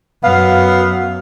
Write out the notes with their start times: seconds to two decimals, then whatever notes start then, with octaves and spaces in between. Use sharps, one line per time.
0.23 F#2 B3 F5